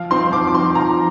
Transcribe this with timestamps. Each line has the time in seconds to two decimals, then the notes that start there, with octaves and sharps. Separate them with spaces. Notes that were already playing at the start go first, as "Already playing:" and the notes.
Already playing: F3 F5
0.10 C4 D#4 C6
0.31 F3 D6
0.47 D6
0.54 C4 D#4 C6
0.75 F3 A#5